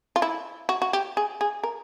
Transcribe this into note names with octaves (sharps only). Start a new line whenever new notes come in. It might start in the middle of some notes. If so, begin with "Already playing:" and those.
F4
E4
F#4
F#4
G4
G#4
G#4
A#4